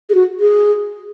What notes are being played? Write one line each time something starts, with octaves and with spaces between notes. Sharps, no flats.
G#4
F#4
G#4